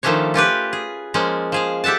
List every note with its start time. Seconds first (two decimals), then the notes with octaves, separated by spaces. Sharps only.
0.03 D#3 F3 A3 C#4 D4 C#5
0.34 C#4 F4 G4 B4
0.73 G#4
1.14 F3 G#3 A#3 C#4
1.52 F3 G#4 F5
1.84 G4 A4 E5 F#5 A5